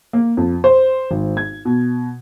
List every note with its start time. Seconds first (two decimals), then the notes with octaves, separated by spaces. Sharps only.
0.13 A#3
0.37 F2
0.64 C5
1.11 G#1
1.37 G#6
1.65 B2